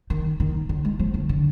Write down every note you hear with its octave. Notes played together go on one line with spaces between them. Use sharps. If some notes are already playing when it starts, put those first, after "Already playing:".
D#3
D#3
D3
G#3
F3
D3
D3